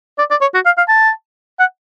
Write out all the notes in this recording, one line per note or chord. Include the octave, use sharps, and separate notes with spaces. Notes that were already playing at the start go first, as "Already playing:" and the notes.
D5
D5
C#5
F#4
F5
F5
A5
F#5